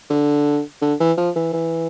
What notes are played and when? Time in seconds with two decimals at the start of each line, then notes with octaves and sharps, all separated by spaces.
0.10 D3
0.82 D3
1.00 E3
1.18 F3
1.36 E3
1.53 E3